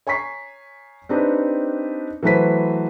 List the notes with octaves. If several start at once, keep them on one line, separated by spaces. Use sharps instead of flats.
C#5 G#5 A#5 C#6 B6 C7
C4 D4 D#4 G4 B4
E3 F#3 A3 B4 C5 B6